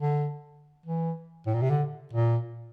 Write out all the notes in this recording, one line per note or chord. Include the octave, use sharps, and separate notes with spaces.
D3
E3
A2
A#2
C3
D3
A#2